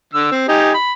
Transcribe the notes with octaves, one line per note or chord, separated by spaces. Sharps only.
D3 E6
C4
D#4 G4 G#5
B5